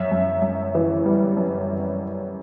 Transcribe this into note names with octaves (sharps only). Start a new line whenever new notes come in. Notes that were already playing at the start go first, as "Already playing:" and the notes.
Already playing: F#2 E5
F#2
F#2
E3
G3
F#2